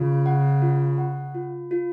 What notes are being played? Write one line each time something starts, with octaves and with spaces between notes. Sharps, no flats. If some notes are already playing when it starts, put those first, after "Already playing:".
Already playing: C#3 F4
F#5
F4
F#5
F4
F4